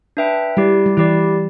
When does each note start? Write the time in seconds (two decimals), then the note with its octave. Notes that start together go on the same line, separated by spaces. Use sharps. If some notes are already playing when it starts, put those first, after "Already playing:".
0.17 D4 B4 E5 G5
0.57 G3 E4 G4 D5
0.86 G3
0.97 E3 E4 G4 D5